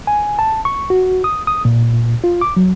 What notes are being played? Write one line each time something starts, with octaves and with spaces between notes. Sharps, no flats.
G#5
A5
C#6
F#4
D#6
D#6
A#2
F4
D6
F#3